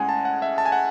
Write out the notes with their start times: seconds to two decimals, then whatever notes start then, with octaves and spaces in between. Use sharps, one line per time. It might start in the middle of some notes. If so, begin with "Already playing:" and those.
Already playing: A2 G#3 C#4 F#5 G#5
0.09 A5
0.25 F#5
0.42 E5
0.58 A5
0.66 G#5
0.72 F#5